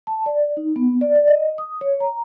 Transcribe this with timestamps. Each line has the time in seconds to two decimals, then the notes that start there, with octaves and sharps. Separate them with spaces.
0.07 A5
0.26 D5
0.57 D#4
0.76 B3
1.01 D5
1.15 D5
1.28 D#5
1.58 D#6
1.81 C#5
2.00 A#5